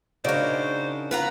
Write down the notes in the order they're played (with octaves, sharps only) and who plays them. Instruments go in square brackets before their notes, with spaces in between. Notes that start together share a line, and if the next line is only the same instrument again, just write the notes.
[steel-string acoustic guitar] C#3 D4 [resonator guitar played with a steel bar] D#4 F#4 A#4 [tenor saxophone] C5 [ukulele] D5
[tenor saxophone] F4 [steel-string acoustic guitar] B4 F#5 A#5